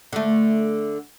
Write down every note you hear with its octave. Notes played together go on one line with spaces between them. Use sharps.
D3 A3